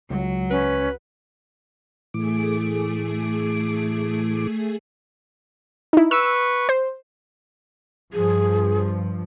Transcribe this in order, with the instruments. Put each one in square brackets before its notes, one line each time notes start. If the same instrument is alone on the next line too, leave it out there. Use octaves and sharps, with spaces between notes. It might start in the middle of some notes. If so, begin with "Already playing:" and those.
[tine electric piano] C#2 [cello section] F#3
[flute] C#4 [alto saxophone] B4
[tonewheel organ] A2 E3 D6 [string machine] A3 G#4
[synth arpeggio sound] D#4 E4
[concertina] B4 C#6 [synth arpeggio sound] E6
[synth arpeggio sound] C5
[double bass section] G2 F3 [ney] G#4